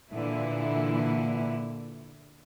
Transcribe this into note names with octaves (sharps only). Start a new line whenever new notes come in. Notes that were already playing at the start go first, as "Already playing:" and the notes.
A#2 D3 E3 A#3 E4